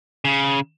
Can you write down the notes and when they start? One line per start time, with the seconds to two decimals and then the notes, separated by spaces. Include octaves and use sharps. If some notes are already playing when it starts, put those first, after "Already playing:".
0.25 C#3